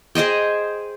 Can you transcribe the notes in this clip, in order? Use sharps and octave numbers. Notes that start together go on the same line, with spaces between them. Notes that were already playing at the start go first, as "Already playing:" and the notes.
G#4 C5 D#5 G5